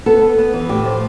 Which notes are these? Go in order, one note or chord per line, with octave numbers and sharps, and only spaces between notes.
B3 A4
B3
B3
E3
A2 G4
F3